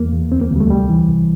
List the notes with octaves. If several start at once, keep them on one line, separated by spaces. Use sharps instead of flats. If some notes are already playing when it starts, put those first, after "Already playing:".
Already playing: E2 A#3
E2
D2 C4
A#3
D2 G3
A3
C2 G3
E3
C2